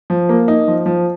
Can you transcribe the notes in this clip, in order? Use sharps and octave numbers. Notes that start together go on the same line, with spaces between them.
F3
A#3
D#4
F3
F3